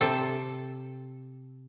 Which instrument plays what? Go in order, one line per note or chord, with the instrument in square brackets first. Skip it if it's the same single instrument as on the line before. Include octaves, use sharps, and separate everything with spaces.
[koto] C3 A4